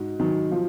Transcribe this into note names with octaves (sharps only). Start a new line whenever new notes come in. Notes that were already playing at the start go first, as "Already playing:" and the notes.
Already playing: G#2 F#4
D#3 F#3
F3